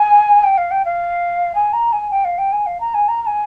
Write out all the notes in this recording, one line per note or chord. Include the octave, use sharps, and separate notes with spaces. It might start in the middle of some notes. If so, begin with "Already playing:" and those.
Already playing: G#5
G5
F5
G5
F5
G#5
A#5
G#5
G5
F5
G5
G#5
F5
A#5
G#5
A#5
A#5
G#5